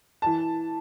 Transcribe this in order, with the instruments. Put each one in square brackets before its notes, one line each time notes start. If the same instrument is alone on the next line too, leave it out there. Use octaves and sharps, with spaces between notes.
[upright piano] E3 A5